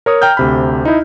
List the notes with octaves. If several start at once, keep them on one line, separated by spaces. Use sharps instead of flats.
A#4 C#5 D#6
G5 A#5 F6 G6
D2 C3 B5
D#4 E4 D#5